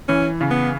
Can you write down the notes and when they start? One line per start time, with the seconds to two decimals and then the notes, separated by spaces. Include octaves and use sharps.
0.08 E3 C#4
0.41 C#3
0.51 B3